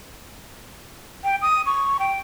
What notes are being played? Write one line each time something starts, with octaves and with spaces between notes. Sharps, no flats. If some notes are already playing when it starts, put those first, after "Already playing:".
G5
D#6
C#6
G5